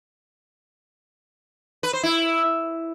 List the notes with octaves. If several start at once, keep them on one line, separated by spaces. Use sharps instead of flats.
B4
C5
E4